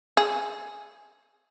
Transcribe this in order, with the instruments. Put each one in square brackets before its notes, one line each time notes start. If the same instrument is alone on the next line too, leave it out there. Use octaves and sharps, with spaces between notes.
[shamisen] G#4